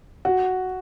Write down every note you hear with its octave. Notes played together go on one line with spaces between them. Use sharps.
F#4